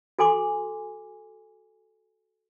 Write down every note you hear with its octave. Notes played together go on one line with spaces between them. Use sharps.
F#4 A4 G#5 C6 D6